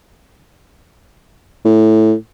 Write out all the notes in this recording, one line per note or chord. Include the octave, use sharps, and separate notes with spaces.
A2